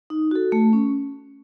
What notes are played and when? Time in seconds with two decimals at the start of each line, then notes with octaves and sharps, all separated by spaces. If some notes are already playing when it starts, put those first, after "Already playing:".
0.10 D#4
0.31 F#4 A4
0.52 A3
0.73 C#4